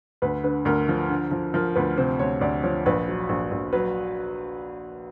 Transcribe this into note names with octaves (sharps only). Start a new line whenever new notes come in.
D2 B4
D3 B4
D2 A#4
F3
D3
F3
F3 A#4
D2 B4
C3 C5
D2 C#5
D2 D5
F3 C#5
A#1 B4
F#3
A#1
A#1
F#3 B4